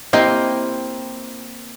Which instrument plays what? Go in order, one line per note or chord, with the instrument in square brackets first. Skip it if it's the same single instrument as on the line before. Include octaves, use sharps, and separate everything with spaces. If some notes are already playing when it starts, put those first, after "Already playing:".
[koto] A#3 C4 G5 [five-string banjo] E4 G4 D#5